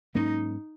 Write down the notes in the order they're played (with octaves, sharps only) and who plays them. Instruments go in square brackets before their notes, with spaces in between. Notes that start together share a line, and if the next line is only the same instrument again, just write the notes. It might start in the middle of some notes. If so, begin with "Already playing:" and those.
[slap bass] G#2 F#3 A#3 C#4 [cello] D#4